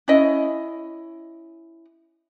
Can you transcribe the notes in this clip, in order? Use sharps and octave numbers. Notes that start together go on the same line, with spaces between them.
C#4 E4 D#5